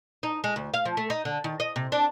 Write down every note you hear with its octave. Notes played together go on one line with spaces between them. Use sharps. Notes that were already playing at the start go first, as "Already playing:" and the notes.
D#4
G#3
D2
F5
F3
A3
D#4
D3
D#3
D#5
C3
D4